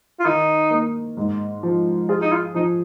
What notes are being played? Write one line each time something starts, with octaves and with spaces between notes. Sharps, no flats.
F4
D#3 D#4
A#3
G#2
F3
F4 G#4
D#4
F4
F3 D#4